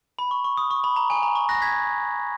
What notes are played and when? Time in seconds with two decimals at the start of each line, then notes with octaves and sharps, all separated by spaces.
0.19 B5
0.31 C#6
0.44 C#6
0.57 D#6
0.71 C#6
0.84 B5
0.96 A#5
1.10 G#5
1.23 A#5
1.35 C#6
1.49 F#6 A#6
1.62 G#6 B6